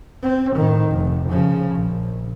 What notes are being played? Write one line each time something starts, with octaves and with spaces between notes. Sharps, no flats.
C4
A2 D#3
F1
C#3 F3
A#1